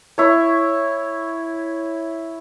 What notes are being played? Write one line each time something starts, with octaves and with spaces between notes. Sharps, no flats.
E4 C#5